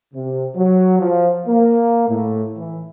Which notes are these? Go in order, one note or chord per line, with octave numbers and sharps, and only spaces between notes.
C3
F#3
F3
A#3
A2
E3